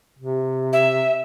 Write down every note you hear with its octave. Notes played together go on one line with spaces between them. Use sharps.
C3
E5